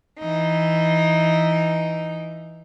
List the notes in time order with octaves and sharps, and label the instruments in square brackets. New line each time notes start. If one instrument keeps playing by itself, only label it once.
[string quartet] E3 D#4